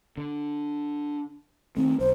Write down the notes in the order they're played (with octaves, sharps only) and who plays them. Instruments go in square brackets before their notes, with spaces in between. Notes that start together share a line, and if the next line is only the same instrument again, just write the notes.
[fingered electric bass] D3
[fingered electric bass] D#3 A3 [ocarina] C4
[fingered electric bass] B1 [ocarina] C5